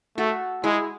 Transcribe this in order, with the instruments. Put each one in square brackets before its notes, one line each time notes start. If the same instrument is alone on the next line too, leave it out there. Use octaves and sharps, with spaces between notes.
[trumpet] A3 [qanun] F#4 A4
[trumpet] G#3 [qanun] E4 G#4